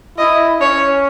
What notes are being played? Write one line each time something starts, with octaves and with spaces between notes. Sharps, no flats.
E4 D#5
C#4 C#5